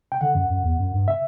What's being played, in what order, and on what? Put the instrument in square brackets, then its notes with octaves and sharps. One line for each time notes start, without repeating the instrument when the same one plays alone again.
[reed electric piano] G5
[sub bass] D3 [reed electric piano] F#5
[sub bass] F#2
F#2
E2
F#2
G2
[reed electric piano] E5